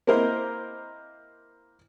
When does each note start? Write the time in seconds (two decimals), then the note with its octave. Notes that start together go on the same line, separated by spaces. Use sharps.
0.07 A#3 C4 E4 A#4 C5 D#5